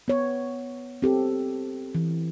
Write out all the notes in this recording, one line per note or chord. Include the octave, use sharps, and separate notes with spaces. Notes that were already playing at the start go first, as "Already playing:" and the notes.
B3 C#5
C4 G4 A4
E3